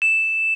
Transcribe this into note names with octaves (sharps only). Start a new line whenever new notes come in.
E7